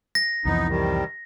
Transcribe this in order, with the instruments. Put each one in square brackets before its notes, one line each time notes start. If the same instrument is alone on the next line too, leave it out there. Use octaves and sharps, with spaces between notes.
[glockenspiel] A#6
[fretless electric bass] C2 F2 E3 [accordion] B3 D#4
[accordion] C3 D#3 G3